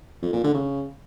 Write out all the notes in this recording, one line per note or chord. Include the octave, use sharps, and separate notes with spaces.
F2
A#2
D3
C#3